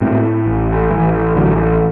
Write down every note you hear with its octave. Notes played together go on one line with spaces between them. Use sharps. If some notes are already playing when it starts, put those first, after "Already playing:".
A2 A3 C4
A1
A1 E3
A1 D3 F#3